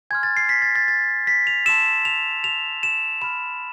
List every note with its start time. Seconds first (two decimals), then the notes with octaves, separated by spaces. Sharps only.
0.11 G#5 C6 F6 G#6
0.23 A6
0.37 C7
0.49 B6
0.62 A6
0.75 A6
0.88 A6
1.27 B6
1.47 F7
1.66 A5 C6 E6 E7
2.05 F7
2.44 F7
2.83 E7
3.22 B5 F6 E7